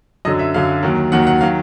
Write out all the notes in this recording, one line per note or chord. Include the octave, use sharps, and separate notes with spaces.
F#2 D3 F#3 D#5
E5
F#2 D3 F#3 F5
D#2 D#3 F#3
D#2 D#3 F#3 F#5
F#5
D#3 F#3 F5